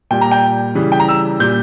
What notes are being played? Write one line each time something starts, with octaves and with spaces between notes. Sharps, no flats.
A#2 G3 G5
A#5
G5
C#3 E3 G3
G5
A#5
E6
A#2 G3 G6